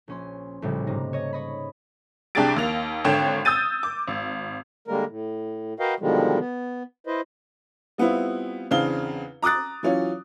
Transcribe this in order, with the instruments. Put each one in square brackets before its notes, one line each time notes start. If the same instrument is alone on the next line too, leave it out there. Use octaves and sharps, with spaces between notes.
[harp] A#1 C#4 C6
A#1 A2 C#3 G3
G#2 C3 D#4
C#5 D#5
C#5 D#5 B5
[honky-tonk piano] C2 D4 G4 G#4 A6 D7
D#2 A#3 F7
G#1 D3 C#5 G5 E7
D#6 E6 G6 A6 D#7
D6
G#1
[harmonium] D3 G3 G#3 A#3 A#4
A2
F#4 A#4 B4 D#5 F5 G5
B2 D3 D#3 F3 G3 G#3
B3
E4 B4 C5 D#5
[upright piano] G3 B3 C4 E4 F4
E2 C#3 C4 D4 F5 G7
A#5 D6 D#6 F#6 A6
E3 F#3 C#4 F4